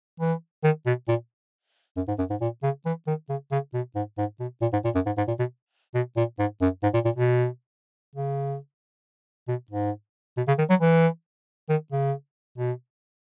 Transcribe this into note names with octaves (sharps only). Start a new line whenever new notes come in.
E3
D#3
B2
A#2
F#2
G#2
F#2
G#2
A#2
C#3
E3
D#3
C#3
C#3
B2
G#2
G#2
B2
A#2
G#2
A#2
F#2
G#2
G#2
A#2
B2
B2
A#2
G#2
F#2
G#2
A#2
A#2
B2
C#3
B2
G#2
B2
C#3
D#3
F#3
E3
D#3
C#3
B2